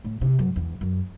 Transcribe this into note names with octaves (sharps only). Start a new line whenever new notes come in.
A2
C3
F#2
E2
F#2